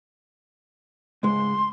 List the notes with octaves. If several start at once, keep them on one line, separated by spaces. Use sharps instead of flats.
C#2 G#2 G#3 C6